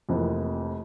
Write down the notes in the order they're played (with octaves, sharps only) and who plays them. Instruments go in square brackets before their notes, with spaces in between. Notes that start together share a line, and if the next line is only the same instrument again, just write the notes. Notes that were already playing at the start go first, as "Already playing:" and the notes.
[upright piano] F1 F2 E3 A#3